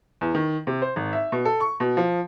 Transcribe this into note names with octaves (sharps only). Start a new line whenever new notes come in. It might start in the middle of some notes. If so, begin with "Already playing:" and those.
E2
D#3
C3
C5
G#1
E5
B2
A4
C#6
B2
F3